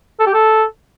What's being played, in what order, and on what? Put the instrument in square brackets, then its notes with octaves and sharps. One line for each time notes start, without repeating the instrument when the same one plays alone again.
[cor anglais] A4
G4
A4